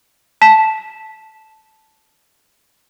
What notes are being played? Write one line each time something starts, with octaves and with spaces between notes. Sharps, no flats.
A5 B6 E7